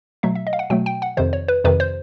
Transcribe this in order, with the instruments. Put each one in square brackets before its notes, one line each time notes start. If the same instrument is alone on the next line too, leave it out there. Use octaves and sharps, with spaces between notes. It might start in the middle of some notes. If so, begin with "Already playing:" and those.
[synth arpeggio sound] B2 F#3 A3 E5
E5
D#5
F5
F#5
B2 F#3 A3 G5
G5
F#5
F2 C3 D#3 C5
C#5
B4
F2 C3 D#3 B4
C5